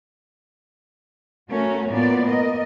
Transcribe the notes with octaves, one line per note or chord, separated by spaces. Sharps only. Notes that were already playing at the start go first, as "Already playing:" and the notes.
A3 C#4 F#4 A#4
A2 A#3 B3 F4 D5
A#4 D#5